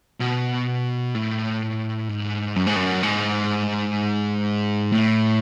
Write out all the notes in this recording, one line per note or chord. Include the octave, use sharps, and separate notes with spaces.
B2
A2
G#2
F#2
G#2
F#2
G#2
A2